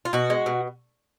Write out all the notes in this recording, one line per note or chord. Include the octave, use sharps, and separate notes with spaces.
F4
B2 F#4
G#3
B2